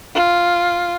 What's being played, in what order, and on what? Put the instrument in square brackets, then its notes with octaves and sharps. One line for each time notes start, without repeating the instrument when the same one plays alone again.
[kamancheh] F4